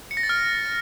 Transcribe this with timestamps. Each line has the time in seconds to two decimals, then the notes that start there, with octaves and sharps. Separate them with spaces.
0.11 C#7
0.17 A#6
0.23 A6
0.29 F6